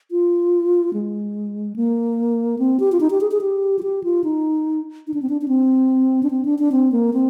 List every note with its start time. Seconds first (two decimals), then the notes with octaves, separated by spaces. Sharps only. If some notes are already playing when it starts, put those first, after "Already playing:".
0.11 F4
0.93 G#3
1.76 A#3
2.59 C4
2.80 G4
2.92 F4
3.00 D#4
3.11 G4
3.21 G#4
3.31 G#4
3.41 G4
3.79 F4
3.83 G4
4.04 F4
4.24 D#4
5.07 D#4
5.14 D4
5.22 C4
5.29 D4
5.41 D4
5.48 C4
6.23 D4
6.30 C4
6.45 D4
6.59 D4
6.72 C4
6.92 A#3
7.13 C4